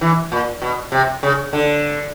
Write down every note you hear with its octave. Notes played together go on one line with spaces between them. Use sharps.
E3
A#2
B2
C3
C#3
D3